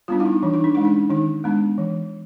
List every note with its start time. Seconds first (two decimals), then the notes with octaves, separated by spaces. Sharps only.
0.08 G3 B3 D4 F4
0.20 E4
0.26 D#4
0.43 E3 D4
0.54 D#4
0.64 D4
0.75 G#3 C#4 D#4
0.85 D4
1.10 D#3 D#4
1.44 G#3 B3 D4
1.78 E3